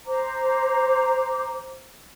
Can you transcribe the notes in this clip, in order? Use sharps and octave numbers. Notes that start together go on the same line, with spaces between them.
C5 A#5 D6